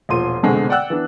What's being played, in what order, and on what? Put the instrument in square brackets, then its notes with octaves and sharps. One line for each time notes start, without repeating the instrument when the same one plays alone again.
[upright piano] E1 A#2 F3 C6 D#7
F1 F2 B2 D3 G#3 C4
D5 F#5 G5 E6 F#6
E3 B3 D4